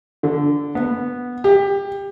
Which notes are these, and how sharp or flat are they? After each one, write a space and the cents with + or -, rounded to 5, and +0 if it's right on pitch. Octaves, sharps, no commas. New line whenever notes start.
D3 -10
B3 -5
G4 +20